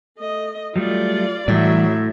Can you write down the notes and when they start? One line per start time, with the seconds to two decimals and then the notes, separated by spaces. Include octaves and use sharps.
0.18 A3 D#5
0.76 F#3 G3 A3 F4 D5
1.48 A2 E3 F#3 G3 D5 E5